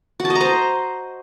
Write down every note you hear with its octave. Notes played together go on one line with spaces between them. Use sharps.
F#4
A5
D#5
A#5
C5